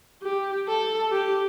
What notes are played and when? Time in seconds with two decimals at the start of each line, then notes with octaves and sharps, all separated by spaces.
0.22 G4
0.67 A4
1.12 G4